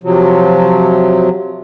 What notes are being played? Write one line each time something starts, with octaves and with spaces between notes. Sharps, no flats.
C3 F3 F#3